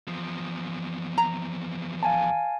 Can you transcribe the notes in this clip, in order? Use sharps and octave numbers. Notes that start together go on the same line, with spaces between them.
E2 F3
A#5
F5 G#5 A5